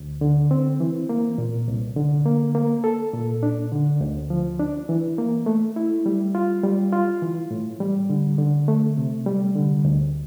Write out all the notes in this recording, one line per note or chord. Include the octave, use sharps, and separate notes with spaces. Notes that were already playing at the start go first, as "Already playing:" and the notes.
Already playing: D2
D3
C4
E3
A#3
A#2
C2
D3
A#3
A#3
A4
A#2
D4
D3
D2
F3
D4
E3
A#3
A3
E4
G3
F4
G3
F4
E3
A2
G3
D3
D3
A3
C3
G3
D3
D2